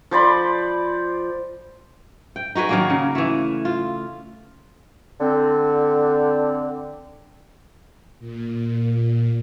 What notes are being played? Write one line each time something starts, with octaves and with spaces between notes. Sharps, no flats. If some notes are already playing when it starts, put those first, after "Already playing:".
F3 C5 D5 B5
G5
D#4 F#4 G#4 B4
D#3 F#3 A#3
C#3
E3 A3
F4
D3 C4
A#2